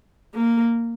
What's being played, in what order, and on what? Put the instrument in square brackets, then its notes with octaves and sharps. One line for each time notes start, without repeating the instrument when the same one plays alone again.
[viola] A#3